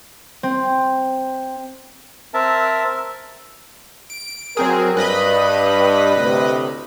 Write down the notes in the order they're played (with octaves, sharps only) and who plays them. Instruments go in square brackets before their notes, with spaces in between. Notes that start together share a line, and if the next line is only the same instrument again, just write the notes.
[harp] C4
[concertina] C4 A#4 E5 A5
[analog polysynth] D7
[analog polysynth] F#3 C4 G#4 [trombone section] A#4
[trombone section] G2 [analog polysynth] B4 D#5 B5
[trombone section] D2 A2 C3